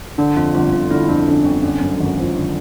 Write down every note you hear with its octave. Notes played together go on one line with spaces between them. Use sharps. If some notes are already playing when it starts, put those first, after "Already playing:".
D3 D4
F2 F4
G1 F4
G1 F4
D3 E4
F2 D4
G1 C#4
G1 C4
D3 C#4
F#2
G#1
F3
D3